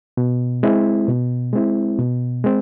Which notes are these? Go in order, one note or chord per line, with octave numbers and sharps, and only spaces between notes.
B2
G#3 C4 E4
B2
G#3 C4 E4
B2
G#3 C4